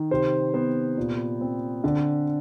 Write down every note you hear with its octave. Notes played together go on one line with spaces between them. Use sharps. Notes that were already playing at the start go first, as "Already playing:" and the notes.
Already playing: D#3
C3 C5
B3 C5
A#2
C4
D3